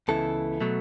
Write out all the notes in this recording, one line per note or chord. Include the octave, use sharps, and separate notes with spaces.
C#2 C#3 E3 B3 E4 A4
B2 F#3 A3